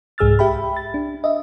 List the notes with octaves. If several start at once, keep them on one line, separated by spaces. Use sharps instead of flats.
C2 G#2 G#4 E6 F6 A6
G4 E5 G5 B5
A6
D4
D#5 E5